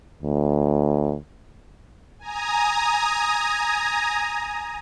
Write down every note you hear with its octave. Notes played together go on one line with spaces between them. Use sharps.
D2
G#5 A#5 D#6